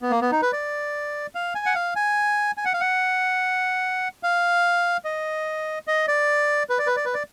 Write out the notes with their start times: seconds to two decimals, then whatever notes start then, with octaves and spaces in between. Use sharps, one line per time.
0.02 B3
0.11 A#3
0.22 B3
0.32 D#4
0.42 B4
0.53 D5
1.35 F5
1.55 G#5
1.66 F#5
1.75 F5
1.96 G#5
2.57 G#5
2.65 F#5
2.74 F5
2.81 F#5
4.23 F5
5.05 D#5
5.87 D#5
6.08 D5
6.69 B4
6.79 D5
6.87 B4
6.96 D5
7.05 B4
7.14 D5